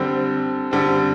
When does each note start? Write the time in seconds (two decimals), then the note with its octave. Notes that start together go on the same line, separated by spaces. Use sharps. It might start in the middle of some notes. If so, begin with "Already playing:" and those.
Already playing: D3 G3 C4
0.71 D3 G3 C4